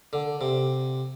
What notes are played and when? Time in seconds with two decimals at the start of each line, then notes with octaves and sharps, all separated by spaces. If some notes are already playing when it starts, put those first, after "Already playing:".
0.13 D3
0.41 C3